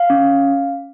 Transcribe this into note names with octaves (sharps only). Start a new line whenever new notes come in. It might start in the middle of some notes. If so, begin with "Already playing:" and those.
Already playing: F5
C#4